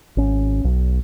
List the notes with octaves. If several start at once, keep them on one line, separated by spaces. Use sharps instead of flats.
G#1 C#4
B1